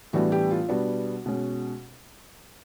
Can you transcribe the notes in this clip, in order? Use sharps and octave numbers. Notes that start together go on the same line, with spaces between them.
A2 E3 G3 B3 D4 F#4
G4
F4
B2 G3 B3 D4 F#4
B2 G#3 C#4